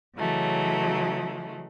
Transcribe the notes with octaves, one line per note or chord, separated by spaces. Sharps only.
C#3 E3 F#3 G#3 A3